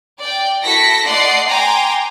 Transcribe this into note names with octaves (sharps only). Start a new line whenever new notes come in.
D5 G5
E4 F#4 A4 A#6 B6 C#7
A3 D5 D#5 F#5 C6 C7
G5 G#5 A#5 C6 D6